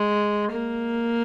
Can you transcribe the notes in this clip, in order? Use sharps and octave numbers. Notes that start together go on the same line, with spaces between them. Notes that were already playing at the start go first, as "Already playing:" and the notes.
Already playing: G#3
A#3